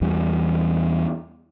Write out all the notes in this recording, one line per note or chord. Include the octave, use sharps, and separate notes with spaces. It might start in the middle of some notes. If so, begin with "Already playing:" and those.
E2 E3 G3